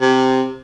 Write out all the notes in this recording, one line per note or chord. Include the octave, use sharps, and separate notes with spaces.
C3